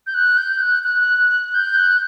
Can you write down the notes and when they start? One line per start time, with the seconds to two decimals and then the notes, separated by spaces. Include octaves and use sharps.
0.07 G6
0.14 F#6
0.38 G6
0.61 F#6
0.83 F#6
1.54 G6
1.77 F#6